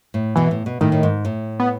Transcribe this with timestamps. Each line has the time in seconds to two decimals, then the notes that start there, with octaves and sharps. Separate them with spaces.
0.14 A2
0.36 B2 E3
0.51 A2
0.66 B2
0.81 A2 D#3
0.92 A2
1.03 G#2
1.25 A2
1.60 B3